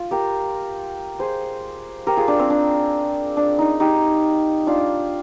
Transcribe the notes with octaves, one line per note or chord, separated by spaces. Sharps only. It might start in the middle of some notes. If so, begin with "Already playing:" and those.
Already playing: F4
G4 A#4
G#4 C5
G4 A#4
F4 G#4
D4
C4
D4
D4
D#4
D#4 G4
D4 F4